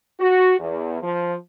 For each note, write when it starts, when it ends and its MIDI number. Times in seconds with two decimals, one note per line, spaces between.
0.20 0.54 66
0.59 1.01 40
1.02 1.34 53